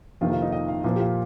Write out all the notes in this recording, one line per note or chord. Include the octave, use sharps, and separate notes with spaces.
F2 C3 D#3 A#3 F4
F4
D#4
D#5
F5
A#2 F3 A#3 F5
G4
F4